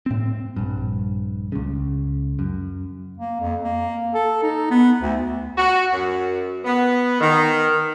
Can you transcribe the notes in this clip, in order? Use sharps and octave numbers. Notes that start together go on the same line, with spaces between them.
A2 C4
A#1 G2
C#2 C#3
F#2
A#3
F2
A#3
A4
D#4
B3
D2
F#4
F#2
B3
D#3